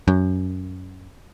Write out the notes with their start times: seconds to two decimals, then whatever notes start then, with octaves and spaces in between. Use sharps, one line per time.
0.08 F#2